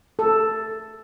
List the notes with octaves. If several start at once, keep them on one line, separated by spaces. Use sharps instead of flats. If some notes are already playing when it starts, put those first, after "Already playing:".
A4